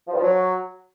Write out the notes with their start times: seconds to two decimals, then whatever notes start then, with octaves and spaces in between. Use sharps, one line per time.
0.08 F3
0.13 G2
0.18 F3
0.23 F#3